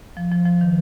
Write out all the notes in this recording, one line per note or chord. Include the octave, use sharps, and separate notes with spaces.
F3
F3
F3
D#3